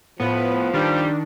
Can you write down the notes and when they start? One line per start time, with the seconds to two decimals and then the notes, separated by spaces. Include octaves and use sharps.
0.20 A2 F3 B3 B4
0.74 D#3 G3 D4